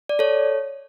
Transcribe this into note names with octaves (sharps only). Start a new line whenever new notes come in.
D5
A4 C#5